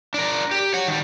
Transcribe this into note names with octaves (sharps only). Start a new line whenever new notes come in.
D4 A#4
G4
C#5 F#5
D#3 G3